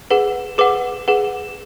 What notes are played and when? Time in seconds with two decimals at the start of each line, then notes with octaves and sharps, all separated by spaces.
0.11 G#4 B4 F#5
0.58 G#4 B4 F#5 D6
1.08 G#4 B4 F#5